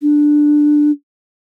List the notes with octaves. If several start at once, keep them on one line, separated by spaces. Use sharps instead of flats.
D4